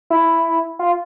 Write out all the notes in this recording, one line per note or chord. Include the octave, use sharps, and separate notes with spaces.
E4
F4